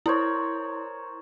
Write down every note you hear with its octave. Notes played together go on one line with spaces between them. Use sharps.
E4 A#4 C5 C#5